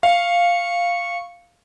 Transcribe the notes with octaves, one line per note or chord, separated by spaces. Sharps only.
F5 C#6